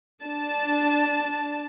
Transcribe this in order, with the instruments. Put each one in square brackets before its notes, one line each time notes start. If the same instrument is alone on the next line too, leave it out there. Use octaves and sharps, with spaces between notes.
[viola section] D4 A5